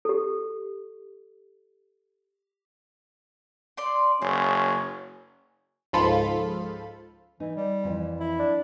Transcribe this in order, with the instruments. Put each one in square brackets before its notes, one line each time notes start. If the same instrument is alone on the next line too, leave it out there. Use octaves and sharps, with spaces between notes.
[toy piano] G4 A4
[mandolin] D5 C6
[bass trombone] F#1 [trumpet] C#4 [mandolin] C5
[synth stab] C#2 G#2 F3 F4 A4 B5
[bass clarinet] E3 [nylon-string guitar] D#4
[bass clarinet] G3
[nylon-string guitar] F2 E3
[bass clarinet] E4
[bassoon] D4